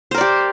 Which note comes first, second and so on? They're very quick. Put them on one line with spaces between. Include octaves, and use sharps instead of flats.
C5 A#4 D5 G4